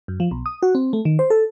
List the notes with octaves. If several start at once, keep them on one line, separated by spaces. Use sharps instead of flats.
F#2
F3
B1
D#6
F#4
C4
A3
D#3
C5
A4